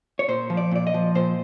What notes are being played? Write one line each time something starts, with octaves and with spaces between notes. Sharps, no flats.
C#5
A#2 C5
F3
D5
A#2 D5
D#5
F3
A#2 C5